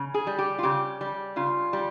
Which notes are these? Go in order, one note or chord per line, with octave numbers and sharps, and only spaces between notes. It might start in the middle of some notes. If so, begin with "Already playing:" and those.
Already playing: C#3
G#4
G3
G4
F4
C#3 G4
G3
C#3 F4
G3